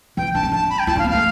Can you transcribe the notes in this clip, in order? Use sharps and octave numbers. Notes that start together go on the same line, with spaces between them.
E3 G5
D4 A5
C4
D4 A5
B5
G5
E4 A5
D4
F5
B3
A3 F5